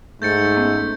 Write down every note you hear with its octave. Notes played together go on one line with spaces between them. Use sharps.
G#2 A3 G6 A6 C#7
B3 C#4 D#4